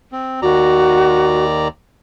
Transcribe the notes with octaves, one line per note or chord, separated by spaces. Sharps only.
C4
D#2 F#4 D5 A#5